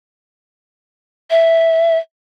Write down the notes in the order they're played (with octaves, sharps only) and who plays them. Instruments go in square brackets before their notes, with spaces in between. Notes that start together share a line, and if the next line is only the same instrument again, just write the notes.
[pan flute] E5